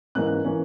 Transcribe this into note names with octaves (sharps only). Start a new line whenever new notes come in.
G#2 E3 A#3 C#4 F#6
E3 A#3 C#4